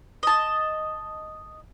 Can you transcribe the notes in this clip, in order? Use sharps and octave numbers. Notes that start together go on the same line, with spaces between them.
D#5 A5